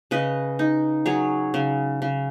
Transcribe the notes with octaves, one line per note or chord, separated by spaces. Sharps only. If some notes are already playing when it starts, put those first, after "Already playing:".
C#3 B4 D#5
D#4
F#3 G#4 C#5
C#3
C#3